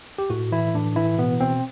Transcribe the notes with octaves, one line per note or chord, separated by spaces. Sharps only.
G4
A2 F#4
E3 E4
A2 D4
E3 E4
B2 B3
B2 C4